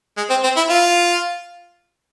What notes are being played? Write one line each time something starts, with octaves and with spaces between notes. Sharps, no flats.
G#3
C4
C4
E4
F4